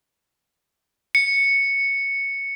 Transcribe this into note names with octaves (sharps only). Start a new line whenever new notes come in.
C#7